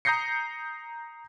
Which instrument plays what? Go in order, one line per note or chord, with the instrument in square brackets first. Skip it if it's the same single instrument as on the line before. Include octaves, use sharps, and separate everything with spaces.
[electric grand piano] A#5 D#6 G6 A#6 C7 C#7